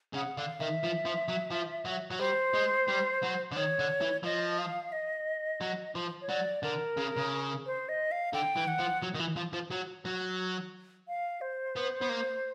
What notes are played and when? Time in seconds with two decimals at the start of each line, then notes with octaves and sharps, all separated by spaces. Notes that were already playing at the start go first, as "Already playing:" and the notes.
0.14 C#3 F#5
0.37 D3 F5
0.60 D#3 E5
0.83 F3
1.05 F3
1.28 F#3
1.51 F3
1.85 F#3
2.11 F#3
2.19 G3 C5
2.54 G#3
2.88 G3
3.23 F#3
3.52 D3
3.56 D#3 C#5
3.80 D3
4.01 E3
4.24 F3 D#5
4.58 F5
4.92 D#5
5.61 F#3
5.95 F3
6.22 C#5
6.29 F#3 D5
6.63 D3 A#4
6.97 C#3
7.17 C#3
7.66 C5
7.89 D#5
8.12 F5
8.34 D3 G5
8.56 E3
8.68 F#5
8.79 F3
9.02 F#3
9.15 D#3
9.20 E3
9.36 F3
9.53 F3
9.71 F#3
10.05 F#3
11.08 F5
11.41 C5
11.76 B3
12.02 B3
12.09 A#3